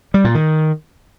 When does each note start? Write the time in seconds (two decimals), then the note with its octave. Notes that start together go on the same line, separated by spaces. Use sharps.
0.14 G3
0.24 A#2
0.35 D#3